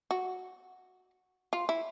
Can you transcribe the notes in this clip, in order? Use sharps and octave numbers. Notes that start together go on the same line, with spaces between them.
F#4
F4
E4